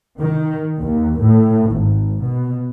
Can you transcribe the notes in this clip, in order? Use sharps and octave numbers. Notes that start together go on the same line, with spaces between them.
D#3
D#2
A2
G#1
B2